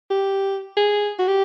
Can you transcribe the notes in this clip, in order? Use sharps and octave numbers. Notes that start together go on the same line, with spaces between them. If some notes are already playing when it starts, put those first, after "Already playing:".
G4
G#4
F#4
G4